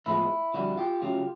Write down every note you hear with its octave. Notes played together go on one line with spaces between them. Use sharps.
A2 F3 G#3 B3 E4
F2 D3 G3 E4 F#4
F4 G4
C#3 F#3 A3 F4 G4